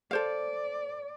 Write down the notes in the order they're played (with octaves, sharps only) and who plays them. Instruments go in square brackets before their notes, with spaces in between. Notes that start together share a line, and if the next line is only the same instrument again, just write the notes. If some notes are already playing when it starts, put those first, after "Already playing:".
[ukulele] A4 C5 F5 [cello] D5